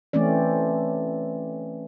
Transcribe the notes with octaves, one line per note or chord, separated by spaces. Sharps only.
E3 A3 C4 C#4 D5